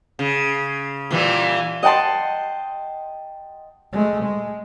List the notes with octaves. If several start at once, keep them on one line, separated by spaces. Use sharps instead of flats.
C#3
A#2 E3 G3
D#5 F#5 G5 A5 C6
G#3 A3
G#3